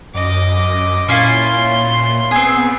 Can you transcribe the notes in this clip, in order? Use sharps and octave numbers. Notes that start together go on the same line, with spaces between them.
F#2 D#5 D6
A#2 C#4 E4 F4 C6
B3 C4 G#4